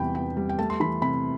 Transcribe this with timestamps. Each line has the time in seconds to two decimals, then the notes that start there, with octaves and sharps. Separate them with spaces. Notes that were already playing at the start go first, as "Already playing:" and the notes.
Already playing: E2 C3 G3 G5 B5
0.15 B3 G5
0.37 G3
0.49 G5
0.59 A3 A5
0.70 C6
0.80 E3 B5
1.02 C3 B5